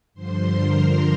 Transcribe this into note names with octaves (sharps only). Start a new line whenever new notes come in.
G2 D3 F3 C5 C6
A#4 A#5